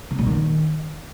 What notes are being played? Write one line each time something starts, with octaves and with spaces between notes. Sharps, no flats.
C#3
A#2
D#3